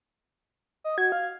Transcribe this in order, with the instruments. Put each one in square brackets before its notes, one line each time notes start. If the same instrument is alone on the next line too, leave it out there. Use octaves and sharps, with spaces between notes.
[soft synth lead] D#5
[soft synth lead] F#4 [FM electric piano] G#6
[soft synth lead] F5